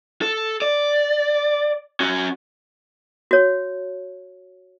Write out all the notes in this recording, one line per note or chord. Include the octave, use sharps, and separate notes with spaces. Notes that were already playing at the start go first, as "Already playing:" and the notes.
A4
D5
C#4 F#4
F#4 C#5